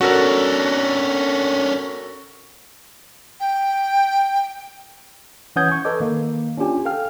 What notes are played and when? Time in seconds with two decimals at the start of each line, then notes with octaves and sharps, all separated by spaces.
0.01 C#4 D4 F#4 A4 A#4
3.40 G5
5.56 E3 C#4 F#5 D#6 G6 G#6
5.72 C#6
5.85 A4 B4 D#5 D6
6.00 D#3 A#3
6.57 C#4 D4 F4 G4 G#5
6.85 A4 F5 G5 F6